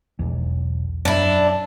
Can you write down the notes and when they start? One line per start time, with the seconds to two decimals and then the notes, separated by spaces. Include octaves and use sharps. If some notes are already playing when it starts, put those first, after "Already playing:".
0.19 E1 B1 E2
1.05 F#2 D4 E4